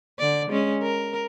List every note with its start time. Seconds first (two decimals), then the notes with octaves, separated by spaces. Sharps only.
0.19 D3 D5
0.50 G#3 C#4
0.83 A#4